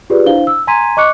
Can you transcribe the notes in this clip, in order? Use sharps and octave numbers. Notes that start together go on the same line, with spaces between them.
F4 G4 G#4 B4 D5
D4 E4 C5 F5 G7
E6
G#5 A#5 C6 G#6 B6 D#7
D#5 C#6 D6 F#6 C#7